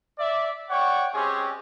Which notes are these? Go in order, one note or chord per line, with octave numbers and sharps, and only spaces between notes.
D5 E5
C#5 D5 F#5 G5 C#6
G#3 C4 C#4 G4 G#4